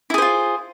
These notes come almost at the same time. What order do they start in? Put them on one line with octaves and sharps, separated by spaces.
E4 G#4 C5 F4